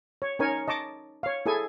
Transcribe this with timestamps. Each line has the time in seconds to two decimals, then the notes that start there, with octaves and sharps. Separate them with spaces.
0.22 C#5
0.39 C#4 D#4 A#4 C#5 G#5
0.68 D#5 A5 C#6 D6
1.23 C#5 F5
1.46 E4 G#4 A4 G#5